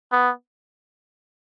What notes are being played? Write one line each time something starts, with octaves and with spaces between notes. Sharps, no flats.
B3